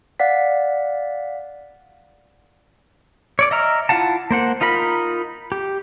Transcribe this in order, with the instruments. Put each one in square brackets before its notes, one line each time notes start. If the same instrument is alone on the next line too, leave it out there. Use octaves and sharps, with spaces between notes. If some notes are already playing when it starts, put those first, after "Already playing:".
[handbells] D5 F5 F#5 B6
[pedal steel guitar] C#5 D5 D6
D#5 E5 A#5 F6
E4 F4 F5 F#5 A5
A#3 C5 F#5
D#4 F4 A#4 B5
G4